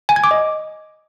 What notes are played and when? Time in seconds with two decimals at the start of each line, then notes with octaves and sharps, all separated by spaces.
0.09 G#5
0.16 G#6
0.24 D6
0.31 D#5